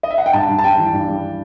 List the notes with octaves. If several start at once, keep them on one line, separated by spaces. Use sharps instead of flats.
D#5
E5
F#5
G5
G2 A5
G2
A5
G3 G5
E3
G2
G3